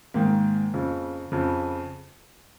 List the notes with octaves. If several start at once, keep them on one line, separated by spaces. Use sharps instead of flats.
G#2 D#3 A#3
F2 C#3
F2 C#3